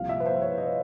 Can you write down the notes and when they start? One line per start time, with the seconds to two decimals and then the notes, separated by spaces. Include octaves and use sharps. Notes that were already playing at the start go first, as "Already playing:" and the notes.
Already playing: C2 A#2 F3 F5
0.09 E5
0.20 B4
0.26 C5
0.42 C#5
0.58 D#5